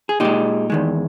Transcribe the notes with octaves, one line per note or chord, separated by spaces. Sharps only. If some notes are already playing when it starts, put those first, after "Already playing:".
G#4
A#2 G#3 D#4 G4
E2 D#3 G#3